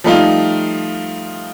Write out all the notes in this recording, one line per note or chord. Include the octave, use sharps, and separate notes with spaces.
F3 G3 A3 D#4 F4